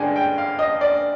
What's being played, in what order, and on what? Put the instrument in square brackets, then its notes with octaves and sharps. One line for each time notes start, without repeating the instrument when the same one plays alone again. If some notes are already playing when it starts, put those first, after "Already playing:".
Already playing: [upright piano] G2 D3 G#3 D4 G5 G#5
G5
F5
D#5
D5